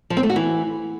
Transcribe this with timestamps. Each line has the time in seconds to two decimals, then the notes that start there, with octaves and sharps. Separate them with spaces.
0.10 F3
0.17 C4
0.23 A3
0.30 F#4
0.36 E3